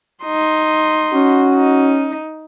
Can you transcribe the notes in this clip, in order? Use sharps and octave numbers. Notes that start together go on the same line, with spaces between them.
D#4 C6
C#4 F#4
D#4